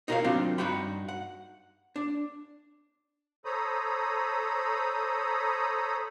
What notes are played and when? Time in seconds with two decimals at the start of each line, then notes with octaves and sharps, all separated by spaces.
0.08 D#4 F4 A#4 B4 C#5 F5
0.24 F#3 C4 D4 D#4 F4
0.58 G2 D#4 F#4 F#5 G5 B5
1.08 F#5
1.96 D4
3.45 A4 C5 C#5 A#5 B5 D#6